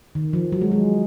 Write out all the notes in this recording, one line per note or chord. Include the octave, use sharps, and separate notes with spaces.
D#3
F3
F#3
G#3
G#3